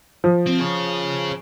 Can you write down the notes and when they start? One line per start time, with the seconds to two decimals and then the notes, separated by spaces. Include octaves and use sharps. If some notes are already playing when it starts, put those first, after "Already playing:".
0.24 F3
0.46 C4
0.59 G#4 C#5